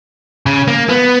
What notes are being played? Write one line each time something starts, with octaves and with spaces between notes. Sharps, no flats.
C#3
A#3
B3